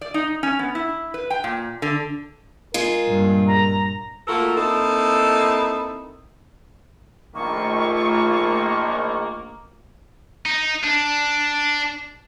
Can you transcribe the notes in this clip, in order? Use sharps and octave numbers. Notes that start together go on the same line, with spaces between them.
D5
D#4
C#4
B3
E4
B4
G5
A#2
D3
G#3 F4 A#4
G2 A#2
A#5
A3 A#3 F4 F#4 A4 A#4
A#3 C4 D#4 E4 A4
A#1 D#3 A3 A#3 F4 C#6
D#4
D4